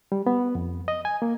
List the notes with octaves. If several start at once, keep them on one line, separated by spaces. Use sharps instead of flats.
G3
B3
F2
D#5
G#5
A#3